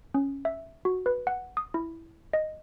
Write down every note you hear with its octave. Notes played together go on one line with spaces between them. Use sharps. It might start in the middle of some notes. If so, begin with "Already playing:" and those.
C#4
E5
F#4
B4
F#5
D#6
E4
D#5